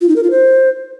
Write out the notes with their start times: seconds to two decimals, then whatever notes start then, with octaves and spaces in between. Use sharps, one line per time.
0.01 F4
0.09 D#4
0.16 A#4
0.23 F4
0.31 C5